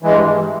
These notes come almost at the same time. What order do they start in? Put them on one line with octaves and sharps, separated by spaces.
E3 G#3 G2